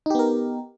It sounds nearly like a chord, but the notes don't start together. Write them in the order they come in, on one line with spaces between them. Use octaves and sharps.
D#4 G4 B3 A#4